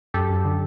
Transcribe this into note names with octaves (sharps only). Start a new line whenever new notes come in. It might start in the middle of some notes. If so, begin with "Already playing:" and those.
F#2 G4 A4
F#2
D3